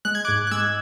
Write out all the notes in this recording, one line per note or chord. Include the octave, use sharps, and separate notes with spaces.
G#3 F#6
G#6
G#2 D6 F#6
F#6
G#3 E6 G#6